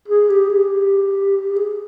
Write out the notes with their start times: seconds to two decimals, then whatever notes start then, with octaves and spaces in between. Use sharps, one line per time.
0.08 G#4
0.30 G4
0.51 G4
1.56 G#4